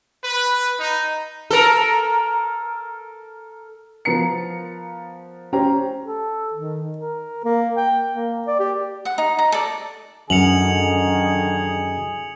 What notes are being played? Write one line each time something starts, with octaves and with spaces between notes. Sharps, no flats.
B4
D#4
A4 A#4
F3 B3 A#4 A#5 C#7
C#4 G4 C5 A#5
A4
D#3
A#4
A#3
G5
A#3
D5
G4
F#5
D#4
A#5
A4 D5
F#2 D3 D#3 D#4 G#4 C#7 F7 F#7